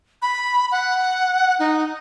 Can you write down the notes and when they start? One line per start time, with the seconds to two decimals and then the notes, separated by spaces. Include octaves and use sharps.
0.22 B5
0.72 F#5
1.59 D#4